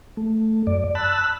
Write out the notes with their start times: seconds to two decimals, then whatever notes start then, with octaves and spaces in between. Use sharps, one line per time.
0.17 A3
0.67 F#2 D5
0.95 A5 B5 E6 F#6